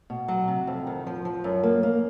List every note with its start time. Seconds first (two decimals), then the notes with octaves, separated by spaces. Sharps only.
0.10 B2
0.28 F#3
0.48 C3
0.67 F2
0.87 D#3
1.07 F3
1.25 F3
1.44 F#2
1.63 A#3
1.83 A#3